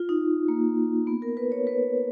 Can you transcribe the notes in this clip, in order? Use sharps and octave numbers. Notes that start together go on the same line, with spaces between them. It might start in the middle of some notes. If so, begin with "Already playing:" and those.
Already playing: F4
D#4
A#3
B3
A#4
B4
C#5
B4